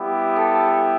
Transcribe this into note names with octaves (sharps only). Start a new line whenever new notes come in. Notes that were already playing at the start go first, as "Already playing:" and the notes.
Already playing: G3 B3 E4 G4
A4